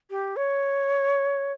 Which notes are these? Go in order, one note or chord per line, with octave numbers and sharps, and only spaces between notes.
G4
C#5